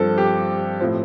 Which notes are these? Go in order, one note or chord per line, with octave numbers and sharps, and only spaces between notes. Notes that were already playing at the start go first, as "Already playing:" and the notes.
Already playing: G2 F3 C4 A4
G4
A2 F3 C4